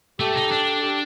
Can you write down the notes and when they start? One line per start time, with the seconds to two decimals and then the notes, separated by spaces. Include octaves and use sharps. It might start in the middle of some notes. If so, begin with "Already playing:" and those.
0.20 A3 G4 A4
0.35 D#4
0.51 D4
0.82 G4